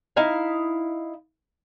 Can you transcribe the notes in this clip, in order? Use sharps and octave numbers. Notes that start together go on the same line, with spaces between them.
D#4 E4 F5